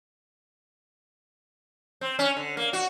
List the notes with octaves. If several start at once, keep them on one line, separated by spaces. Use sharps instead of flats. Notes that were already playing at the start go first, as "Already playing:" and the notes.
C4
C#4
D3
A#3
F#4